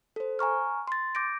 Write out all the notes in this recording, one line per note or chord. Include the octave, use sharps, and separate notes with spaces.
A4 C5
G#5 A#5 C#6 F6
C6 A6
D6 G6 A#6 D7